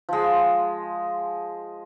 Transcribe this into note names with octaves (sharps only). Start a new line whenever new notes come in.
F3 G#3